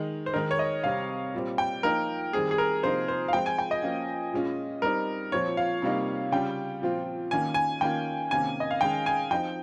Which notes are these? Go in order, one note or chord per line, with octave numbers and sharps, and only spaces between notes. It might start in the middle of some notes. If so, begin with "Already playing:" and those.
Already playing: D#3 G#3 D#4
C5
D#3 G#3 D#4 A#4
C#5
D#5
C3 G3 C4 F5
A#2 G3 C4
G5
F3 A#3 D#4 A#4
D#3 G3 C4 G#4
G#4
A#4
C3 F3 A#3 D#4 C5
C5
F5
F3 G#3 C4 G5
G#5
G5
D#5
F3 A#3 C#4
A#2 G#3 C#4 F4
G3 C4 D#4 A#4
A#2 F3 C4 C#5
F5
C3 G3 A#3 D#4
C#3 G3 C#4 F4 G5
A#2 F3 C4 F4
D#3 A#3 C#4 G#5
G#5
D#3 A#3 C#4 F4 G5
C3 D#3 A#3 C#4 G#5
D#5
F5
D#3 G#3 C#4 G5
G#5
F3 C4 D#4 G5